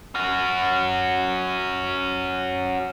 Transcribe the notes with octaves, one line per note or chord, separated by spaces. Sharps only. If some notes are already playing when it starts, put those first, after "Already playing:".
C#4 F#4